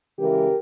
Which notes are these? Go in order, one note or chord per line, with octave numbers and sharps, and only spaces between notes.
C#3 E3 G#3 G4 A#4